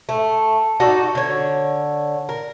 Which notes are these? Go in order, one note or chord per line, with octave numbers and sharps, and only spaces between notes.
A3
D#4 F#4 A4 D5
D3 C#5
A#4